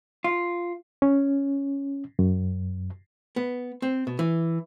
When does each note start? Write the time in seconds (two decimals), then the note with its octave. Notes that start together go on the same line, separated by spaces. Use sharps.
0.24 F4
1.02 C#4
2.19 F#2
3.36 B3
3.82 C4
4.07 B2
4.19 E3